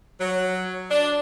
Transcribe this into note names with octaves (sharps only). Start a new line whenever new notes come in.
F#3
D4